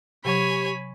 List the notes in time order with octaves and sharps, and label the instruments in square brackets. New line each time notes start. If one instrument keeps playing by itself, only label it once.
[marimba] C3 F#3 [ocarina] G4 [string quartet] C#5 G#5 [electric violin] B5